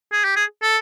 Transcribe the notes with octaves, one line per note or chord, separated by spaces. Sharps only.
G#4
G4
G#4
A4